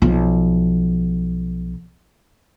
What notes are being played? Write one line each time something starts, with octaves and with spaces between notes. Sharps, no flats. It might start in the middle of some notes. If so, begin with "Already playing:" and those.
B1 F3